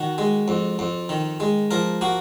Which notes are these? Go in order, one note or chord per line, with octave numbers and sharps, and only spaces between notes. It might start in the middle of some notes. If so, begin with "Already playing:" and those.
Already playing: D#3 F#4
G#3
F2
F2
D#3
G#3
F3 A#4
A#3 F#4